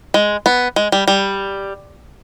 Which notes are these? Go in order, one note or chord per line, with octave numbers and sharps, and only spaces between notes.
G#3
B3
G#3
G3
G3